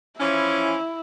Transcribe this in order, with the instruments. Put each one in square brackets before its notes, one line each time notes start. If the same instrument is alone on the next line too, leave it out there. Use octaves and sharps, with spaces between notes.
[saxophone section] E3 F3 C#4 [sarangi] E4